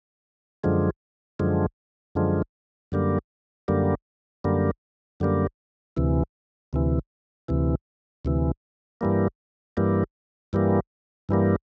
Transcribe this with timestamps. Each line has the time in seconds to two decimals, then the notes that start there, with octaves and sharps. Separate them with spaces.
0.64 F#2 D3 F3 G#3
1.39 F#2 D3 F3 G#3
2.15 F#2 D3 F3 G#3
2.92 F#2 D3 G3 A#3
3.68 F#2 D3 G3 A#3
4.44 F#2 D3 G3 A#3
5.20 F#2 D3 G3 A#3
5.97 D2 C3 E3
6.73 D2 C3 E3
7.48 D2 C3 E3
8.25 D2 C3 E3
9.01 G2 E3 G3 A#3
9.77 G2 E3 G3 A#3
10.53 G2 E3 G3 A#3
11.29 G2 E3 G3 A#3